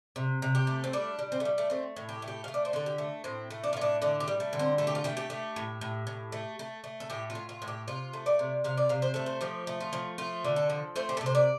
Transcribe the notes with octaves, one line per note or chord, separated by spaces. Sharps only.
C3
C3
G4
A3
C4
G3 D4
G3
C4
A3
G3
A3
A3 C4
A2
G4
A3
G4
A3 F5
D5
C5
D3 A4
G4
A3
A2 C4
A3
D4
F4
A2 D4
D3 D4
G4
G3
A3
D3
C4
A3 A4
G4
F4
A3 G4
G4
A3
A2
A2
A2
A3
A3
A3
A4
A2 G4
F4
A2
F4
A2
G4
C3 F4
A3
D5
C3
C3 F5
D5
C3 F5
C5
A3 A4
C5
F3 G4
A3
F4
F3
A3 F4
D3
A4
F3
A3 C5
G4
A4
C3
C5
D5